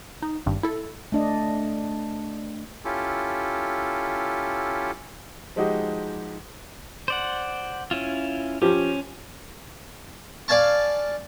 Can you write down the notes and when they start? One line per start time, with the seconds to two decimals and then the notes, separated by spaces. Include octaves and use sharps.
0.22 D#4
0.46 G#1 G2
0.63 E4 A4
1.12 A3 D4 D#5
2.85 C#4 E4 F4 G4 A4
5.56 F3 G#3 D#4 F#4 G4
7.08 C5 D5 F#5
7.91 C#4 E4 F4
8.62 F3 C#4 G4
10.48 D5 F5 G#5 A5 C#6